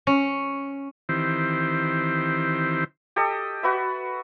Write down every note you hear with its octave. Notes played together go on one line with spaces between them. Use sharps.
C#4
D#3 E3 C4 E4 G4 C5
G4 A4 D#5
F#4 B4 E5